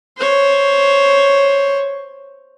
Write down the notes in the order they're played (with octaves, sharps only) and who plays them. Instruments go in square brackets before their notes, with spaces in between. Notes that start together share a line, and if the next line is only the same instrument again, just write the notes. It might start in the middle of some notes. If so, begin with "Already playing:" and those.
[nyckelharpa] C5 C#5